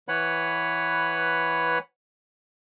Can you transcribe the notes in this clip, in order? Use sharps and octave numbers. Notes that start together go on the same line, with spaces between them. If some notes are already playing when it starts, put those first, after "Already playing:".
E3 B4 C#5 F#5 B5